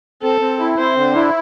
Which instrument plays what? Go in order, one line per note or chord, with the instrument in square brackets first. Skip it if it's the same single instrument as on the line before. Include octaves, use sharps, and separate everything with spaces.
[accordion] C4 [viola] A4
[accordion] C4
E4
[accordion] C4 [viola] C5
[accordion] D3
E4